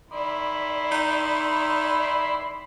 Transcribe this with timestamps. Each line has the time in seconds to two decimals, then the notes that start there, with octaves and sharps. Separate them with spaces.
0.11 D#3 E4 D5 B5 C6
0.92 D#4